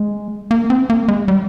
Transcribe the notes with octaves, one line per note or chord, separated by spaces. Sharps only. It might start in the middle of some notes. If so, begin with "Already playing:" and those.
Already playing: G#3
A#3
C4
A#3
G#3
G3